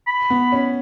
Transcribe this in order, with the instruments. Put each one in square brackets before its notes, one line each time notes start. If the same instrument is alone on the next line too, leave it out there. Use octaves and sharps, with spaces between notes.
[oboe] B5
[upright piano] B3
C#4